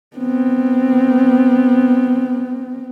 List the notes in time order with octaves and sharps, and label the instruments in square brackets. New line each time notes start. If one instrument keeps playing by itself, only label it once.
[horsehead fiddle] B3 C4